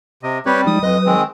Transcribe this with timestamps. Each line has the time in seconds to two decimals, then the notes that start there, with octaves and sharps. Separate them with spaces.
0.23 C3 D#5
0.46 G3 C4 G4 B4 C#5
0.67 F3 G#3 D#4 D#6
0.83 F2 F#3 B4 D#5
1.06 D#3 G#3 C4